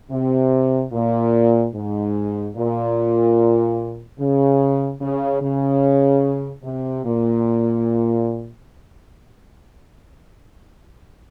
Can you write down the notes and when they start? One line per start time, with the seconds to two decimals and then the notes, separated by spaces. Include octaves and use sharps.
0.11 C3
0.92 A#2
1.75 G#2
2.56 A#2
4.19 C#3
5.01 C#3
5.41 C#3
6.64 C3
7.04 A#2